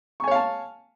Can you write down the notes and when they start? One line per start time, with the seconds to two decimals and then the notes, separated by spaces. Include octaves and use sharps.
0.20 C#6
0.24 G#5
0.28 C#5
0.31 F5
0.35 A5